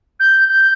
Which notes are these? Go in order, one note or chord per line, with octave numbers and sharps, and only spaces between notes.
G6
G6